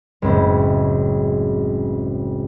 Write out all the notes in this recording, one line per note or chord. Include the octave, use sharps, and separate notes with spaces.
F#1 C#2 A2 G#3 C4 E4